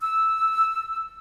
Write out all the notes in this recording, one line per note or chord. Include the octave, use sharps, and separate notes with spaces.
E6